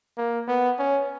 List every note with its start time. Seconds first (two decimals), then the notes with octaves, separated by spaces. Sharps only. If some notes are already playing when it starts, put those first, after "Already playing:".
0.18 A#3
0.48 B3
0.79 C#4